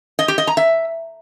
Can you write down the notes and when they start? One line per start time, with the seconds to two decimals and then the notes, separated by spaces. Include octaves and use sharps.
0.19 D#5
0.28 G4
0.38 D#5
0.47 A#5
0.57 E5